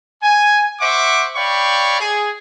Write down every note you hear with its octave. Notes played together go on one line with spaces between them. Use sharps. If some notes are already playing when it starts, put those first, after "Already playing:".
G#5
C5 E5 F#5 C#6 D6
C#5 D5 F5 G5 B5 C#6
G#4